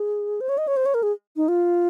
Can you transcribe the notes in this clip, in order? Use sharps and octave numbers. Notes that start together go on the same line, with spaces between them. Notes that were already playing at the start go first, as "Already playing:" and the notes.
Already playing: G#4
C5
C#5
D#5
C#5
C5
C#5
A#4
G#4
D#4
F4